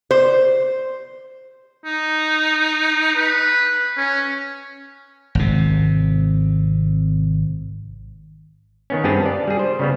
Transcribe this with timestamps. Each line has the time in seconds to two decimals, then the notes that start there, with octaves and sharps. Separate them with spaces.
0.11 C5
1.85 D#4
3.16 B4
3.97 C#4
5.35 G#1 C3
8.90 D#3 B3 C#4
9.04 G2 B3 C4 G4 G#4 A5
9.26 D5
9.47 G3 G#4
9.59 C5
9.79 C#3 G3 B3